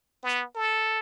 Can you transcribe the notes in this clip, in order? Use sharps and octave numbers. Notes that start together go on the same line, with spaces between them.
B3
A4